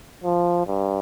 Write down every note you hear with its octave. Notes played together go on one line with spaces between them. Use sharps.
F3
G2